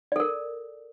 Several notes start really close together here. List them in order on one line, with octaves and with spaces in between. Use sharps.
D5 A4 A#4